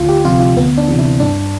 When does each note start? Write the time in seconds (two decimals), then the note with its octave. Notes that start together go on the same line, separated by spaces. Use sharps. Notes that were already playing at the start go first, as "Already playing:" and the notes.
Already playing: D2 F4
0.09 G4
0.24 C3 F3 F4
0.40 F4
0.56 D2 B3
0.78 D4
0.88 C3 E3
0.99 E4
1.20 G2 D4